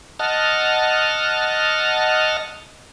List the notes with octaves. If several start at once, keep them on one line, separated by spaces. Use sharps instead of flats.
D#5 F#5 A5 F6